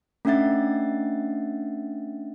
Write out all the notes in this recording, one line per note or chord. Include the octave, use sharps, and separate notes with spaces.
A3 C#4 D4 E5 F#5 A6